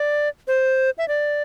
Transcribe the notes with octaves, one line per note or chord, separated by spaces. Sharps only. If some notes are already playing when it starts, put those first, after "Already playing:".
Already playing: D5
C5
E5
D5